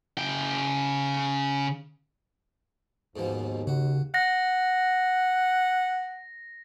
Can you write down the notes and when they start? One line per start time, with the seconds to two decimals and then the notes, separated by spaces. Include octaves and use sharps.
0.18 C#3 G5
3.16 D#2 G#2 B2 F3
3.67 C#3 F#4
4.14 F#5 A#6